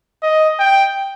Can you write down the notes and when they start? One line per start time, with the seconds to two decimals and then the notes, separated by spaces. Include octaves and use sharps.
0.23 D#5
0.59 G5